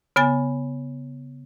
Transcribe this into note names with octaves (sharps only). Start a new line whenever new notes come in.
C#3 B3 G#5 A6